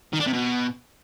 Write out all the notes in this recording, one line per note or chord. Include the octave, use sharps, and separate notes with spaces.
D#3
D4
C3
B2